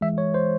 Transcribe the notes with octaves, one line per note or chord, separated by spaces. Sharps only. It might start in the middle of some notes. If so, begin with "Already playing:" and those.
E3 G#3 E5
C#5
C5